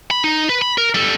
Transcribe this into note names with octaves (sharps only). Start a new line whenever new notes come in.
B5
D#4
B4
B5
A#4
G3 A4